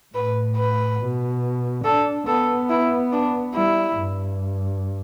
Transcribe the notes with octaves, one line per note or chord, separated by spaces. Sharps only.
A2 B4
B4
B2
D4 A4
B3 A4
E4
D4
G3 E4
G2